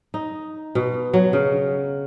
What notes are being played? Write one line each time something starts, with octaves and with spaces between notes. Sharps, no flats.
D#4
B2
F#3
C#3